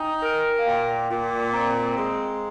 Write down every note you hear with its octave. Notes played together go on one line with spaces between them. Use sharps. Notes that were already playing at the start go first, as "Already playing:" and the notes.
Already playing: D#4 G5 G#5
A#4
F5
A#2 G5
A#2
C4 A#5
G#3